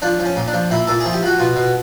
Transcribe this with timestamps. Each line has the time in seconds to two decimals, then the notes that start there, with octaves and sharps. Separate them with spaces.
0.02 F3 D4
0.19 F3
0.25 C#4
0.36 A#2
0.48 D4
0.53 F3
0.70 A#2 E4
0.87 A#2 A4
1.00 G#4
1.05 F3
1.13 G4
1.22 F3 F#4
1.39 B2 F4
1.56 B2